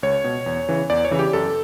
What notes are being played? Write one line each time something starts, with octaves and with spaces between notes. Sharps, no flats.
C#2 C#5
B2
E2
C#3 E3
E2 D5
C#5
C#3 E3
G4
F#2 A4